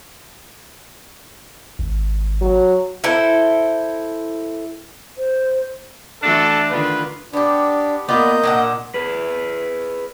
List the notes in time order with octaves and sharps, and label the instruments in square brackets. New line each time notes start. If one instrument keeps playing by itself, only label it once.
[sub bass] G#1
[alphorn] F#3
[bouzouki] E4 A4 C5
[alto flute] C5
[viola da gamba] E3 A3 F#4 [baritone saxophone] D4 [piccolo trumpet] A4
[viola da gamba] D3 D#3 F4 [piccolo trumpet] B4
[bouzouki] B3 G4 [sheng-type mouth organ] D4
[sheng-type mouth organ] A#3 D#5 G6 [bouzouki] B3 F4 D5
[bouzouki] A#2 D4 F#5
[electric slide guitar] G#4 B4